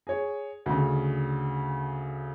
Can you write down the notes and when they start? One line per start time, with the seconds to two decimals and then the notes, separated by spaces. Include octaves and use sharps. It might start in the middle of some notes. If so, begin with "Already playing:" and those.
0.07 G#4 C#5
0.66 D2 C#3